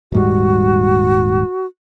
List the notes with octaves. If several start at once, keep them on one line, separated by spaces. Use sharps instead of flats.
D#1 G#2 G3 F#4